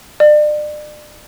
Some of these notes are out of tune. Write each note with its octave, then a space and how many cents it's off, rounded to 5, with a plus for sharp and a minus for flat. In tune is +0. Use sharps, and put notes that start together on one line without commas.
D5 +35